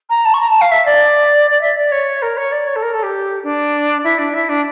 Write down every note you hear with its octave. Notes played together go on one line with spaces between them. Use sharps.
A#5
A5
C#6
A#5
A5
F5
E5
D5
D5
E5
D5
C#5
A#4
C#5
D5
C#5
A4
A#4
A4
G4
D4
E4
D4
E4
D4